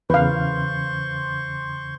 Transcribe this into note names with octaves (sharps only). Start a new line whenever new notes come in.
E2 C#3 B4 C5 F5 C6 C#6